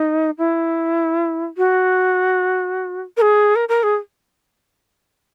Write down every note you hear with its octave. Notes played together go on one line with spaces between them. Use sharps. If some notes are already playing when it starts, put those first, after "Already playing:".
Already playing: D#4
E4
F#4
A#4
G#4
A#4
A#4
G#4